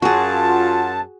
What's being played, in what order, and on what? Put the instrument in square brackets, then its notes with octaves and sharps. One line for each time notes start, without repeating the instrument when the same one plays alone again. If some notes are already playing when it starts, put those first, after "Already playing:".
[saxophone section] F#2 [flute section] F4 F#5 [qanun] F#4 G#4 [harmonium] A5